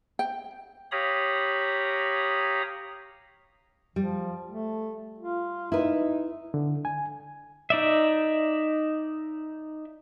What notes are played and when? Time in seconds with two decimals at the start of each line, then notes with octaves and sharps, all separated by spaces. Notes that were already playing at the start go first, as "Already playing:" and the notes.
0.19 G5
0.92 G4 C#5 F5 A#5 B5 D#6
3.96 F3 G3
4.51 A3
5.19 F4
5.72 D#4 E4 B4
6.54 D3
6.85 G#5
7.70 D#4 D5 E5